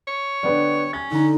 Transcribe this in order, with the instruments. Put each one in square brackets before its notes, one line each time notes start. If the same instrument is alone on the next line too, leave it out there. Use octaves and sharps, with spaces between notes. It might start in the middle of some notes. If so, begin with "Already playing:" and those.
[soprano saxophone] C#5
[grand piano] D3 B3 D4 [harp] G3
[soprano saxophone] C#4 [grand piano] G#6
[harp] D3 A#5 [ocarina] D#4